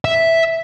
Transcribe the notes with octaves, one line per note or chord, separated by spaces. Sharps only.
E5